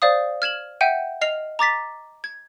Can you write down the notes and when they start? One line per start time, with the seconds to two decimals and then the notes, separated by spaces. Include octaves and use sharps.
0.02 C5 D5 F5 D#6
0.42 F6 G#6 E7 F#7
0.81 E5 F#5 G5 G6 D#7
1.21 D#5 F6 C7 F7
1.59 A#5 D6 A6 B6
2.24 G#6